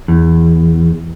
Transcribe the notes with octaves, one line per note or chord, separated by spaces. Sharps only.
E2